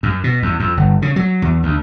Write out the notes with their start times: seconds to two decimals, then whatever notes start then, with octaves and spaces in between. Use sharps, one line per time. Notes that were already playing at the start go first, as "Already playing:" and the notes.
0.03 F#2
0.24 B2
0.43 E2
0.60 F2
0.77 G1
1.02 C#3
1.16 F#3
1.42 E2
1.63 D2